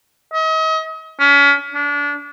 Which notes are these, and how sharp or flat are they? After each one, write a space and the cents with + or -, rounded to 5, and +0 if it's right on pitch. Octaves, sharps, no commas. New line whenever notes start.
D#5 +40
C#4 +35
D4 -30